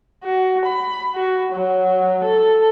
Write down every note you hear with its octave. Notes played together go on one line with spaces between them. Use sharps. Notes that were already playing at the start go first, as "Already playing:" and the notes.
F#4
B5
F#4
F#3
A4